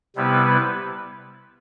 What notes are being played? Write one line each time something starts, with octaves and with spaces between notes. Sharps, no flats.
C3 G3 B3 E4 B4